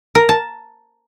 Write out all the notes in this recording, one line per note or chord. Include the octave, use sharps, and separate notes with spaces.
A#4
A5